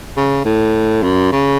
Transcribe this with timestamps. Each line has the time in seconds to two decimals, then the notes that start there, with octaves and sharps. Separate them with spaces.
0.17 C#3
0.45 A2
1.03 F#2
1.32 C#3